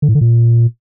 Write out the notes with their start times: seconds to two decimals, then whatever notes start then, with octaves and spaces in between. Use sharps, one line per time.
0.02 D3
0.09 A2
0.15 D3
0.21 A#2